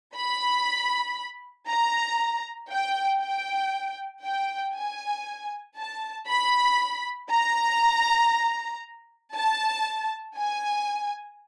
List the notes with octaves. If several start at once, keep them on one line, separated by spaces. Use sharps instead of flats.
B5
A#5
G5
G5
G5
G#5
A5
B5
A#5
A5
G#5